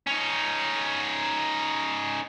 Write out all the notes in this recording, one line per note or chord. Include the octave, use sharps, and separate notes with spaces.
C#4 D#4